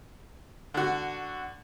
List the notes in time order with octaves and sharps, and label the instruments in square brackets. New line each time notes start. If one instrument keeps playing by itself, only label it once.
[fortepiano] D3 F#4